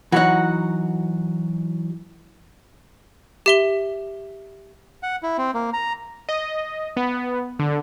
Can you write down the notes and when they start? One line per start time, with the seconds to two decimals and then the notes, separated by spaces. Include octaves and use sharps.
0.12 E3 F#3 D#4 F#4 F#5
3.46 G4 E5 G7
5.03 F#5
5.23 E4
5.38 C4
5.54 A#3
5.73 A#5
6.29 D#5
6.97 B3
7.59 D3